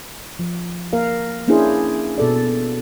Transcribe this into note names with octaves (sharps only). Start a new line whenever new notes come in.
F3
A#3 A#4 F5
A#3 C#4 D4 E4 G#4 C5
B2 A4 D5